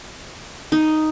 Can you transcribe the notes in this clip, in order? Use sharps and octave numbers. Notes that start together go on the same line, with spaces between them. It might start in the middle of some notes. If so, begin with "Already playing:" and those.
D#4